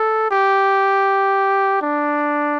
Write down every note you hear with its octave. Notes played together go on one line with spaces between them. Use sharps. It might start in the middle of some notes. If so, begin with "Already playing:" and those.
Already playing: A4
G4
D4